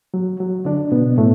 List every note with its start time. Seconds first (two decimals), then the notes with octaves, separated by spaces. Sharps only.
0.14 F#3
0.40 F#3
0.65 D3 D4
0.92 B2 B3
1.18 A2 A3